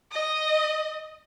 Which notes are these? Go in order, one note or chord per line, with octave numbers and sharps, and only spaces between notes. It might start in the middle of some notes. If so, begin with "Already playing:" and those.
D#5